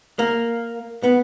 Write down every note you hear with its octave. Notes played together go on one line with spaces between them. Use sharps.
A#3
B3